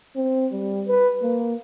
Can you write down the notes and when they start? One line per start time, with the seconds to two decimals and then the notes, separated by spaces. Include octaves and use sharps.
0.16 C4
0.52 G3
0.88 B4
1.22 A#3